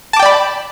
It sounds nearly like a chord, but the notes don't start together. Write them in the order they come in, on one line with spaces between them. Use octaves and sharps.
A5 D6 G5 D5 B5